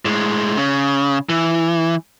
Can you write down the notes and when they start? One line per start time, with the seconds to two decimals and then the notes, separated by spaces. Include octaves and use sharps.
0.05 A2 G#3
0.57 C#3
1.29 E3